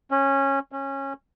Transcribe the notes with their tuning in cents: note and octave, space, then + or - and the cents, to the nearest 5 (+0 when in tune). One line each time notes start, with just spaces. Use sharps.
C#4 -15
C#4 -20